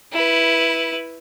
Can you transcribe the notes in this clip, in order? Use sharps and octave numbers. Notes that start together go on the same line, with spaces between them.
E4 B4